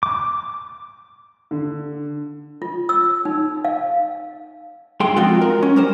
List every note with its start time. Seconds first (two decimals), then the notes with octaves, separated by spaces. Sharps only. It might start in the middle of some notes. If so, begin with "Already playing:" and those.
0.03 D6
1.51 D3
2.62 F4
2.89 E6
3.25 D#4
3.65 F5
5.00 G2 G#4 G5 C6
5.16 F3 G#3 C4 F4 F#4
5.41 A#4
5.62 C#4
5.76 G3 A#4 C5